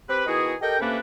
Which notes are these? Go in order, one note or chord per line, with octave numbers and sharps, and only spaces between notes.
C4 G4 B4
D#3 B3 E4 F#4 G#4
G4 A4 A#4 D#5 G5
C3 A3 A#3 C#4 D4 B4